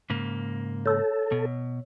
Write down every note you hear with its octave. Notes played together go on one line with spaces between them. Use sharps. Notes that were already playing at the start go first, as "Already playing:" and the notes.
G#2 C#3 A#3
A4 C#5 E6
B2